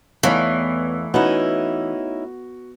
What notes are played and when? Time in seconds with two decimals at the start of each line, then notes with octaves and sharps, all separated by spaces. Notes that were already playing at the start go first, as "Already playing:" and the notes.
0.23 E2 E3 A3 B3 D#4 B4 C#5 F5
1.14 B3 C#4 D#4 E4 F#4 F#5